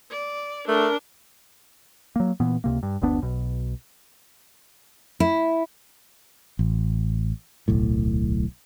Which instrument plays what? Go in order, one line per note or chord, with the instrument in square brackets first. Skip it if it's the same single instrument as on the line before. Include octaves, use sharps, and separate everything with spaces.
[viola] D5
[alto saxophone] A3 [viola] D4 [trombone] A#4
[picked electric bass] F#3 A#3
A#2 E3 B3
C#2 C3 A#3
G2
F#1 D2 B3 D4
B1 B2
[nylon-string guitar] E4
[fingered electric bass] A1
D1 B1 A2